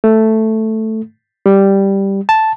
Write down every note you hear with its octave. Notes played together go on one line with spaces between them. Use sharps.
A3
G3
A5